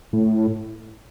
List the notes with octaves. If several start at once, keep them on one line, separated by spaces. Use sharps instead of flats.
A2